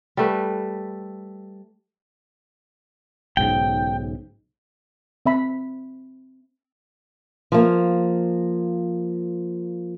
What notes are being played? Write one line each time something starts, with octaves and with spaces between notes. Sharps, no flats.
G3 A3 B4
B1 G#2 C#3 G5
C4 E5 B5
F3 A#3